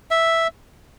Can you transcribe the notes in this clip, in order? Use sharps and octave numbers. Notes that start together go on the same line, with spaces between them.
E5